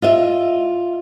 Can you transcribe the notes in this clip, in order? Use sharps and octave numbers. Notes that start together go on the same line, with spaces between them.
F4 D#5 E5